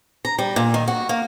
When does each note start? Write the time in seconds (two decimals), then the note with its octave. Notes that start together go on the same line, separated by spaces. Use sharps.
0.25 A#5
0.39 G3
0.56 A#2
0.74 D#3
0.88 F#4
1.09 A#3